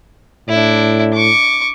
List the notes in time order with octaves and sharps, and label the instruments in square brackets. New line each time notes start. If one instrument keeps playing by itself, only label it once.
[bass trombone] A2 [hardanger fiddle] D4 E4
[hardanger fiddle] C#6 D6